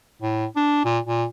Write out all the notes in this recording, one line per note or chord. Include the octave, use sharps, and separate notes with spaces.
A2
D4
A#2
A#2